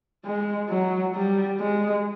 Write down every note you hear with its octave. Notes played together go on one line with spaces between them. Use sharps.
G#3
F#3
G3
G#3